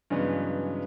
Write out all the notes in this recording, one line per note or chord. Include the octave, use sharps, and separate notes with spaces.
G2 C#3 E3 F#3 G#3 B3